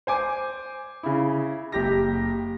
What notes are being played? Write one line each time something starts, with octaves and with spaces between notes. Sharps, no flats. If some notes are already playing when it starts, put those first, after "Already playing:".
C5 G#5 D6
C#3 E4
F#1 G4 A#6